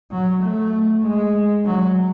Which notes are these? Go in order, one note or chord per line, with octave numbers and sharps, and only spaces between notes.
F#3
A3
G#3
F#3